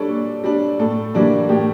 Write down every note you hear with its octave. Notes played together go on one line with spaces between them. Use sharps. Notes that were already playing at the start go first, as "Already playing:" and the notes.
Already playing: G3 D4 A4 C#5
A#2
G3 D4
A2 A4
E3 G3 A#3 D4
A2 G4